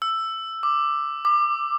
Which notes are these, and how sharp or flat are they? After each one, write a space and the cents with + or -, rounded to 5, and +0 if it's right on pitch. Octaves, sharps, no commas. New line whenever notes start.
E6 +10
D6 +10
D6 +25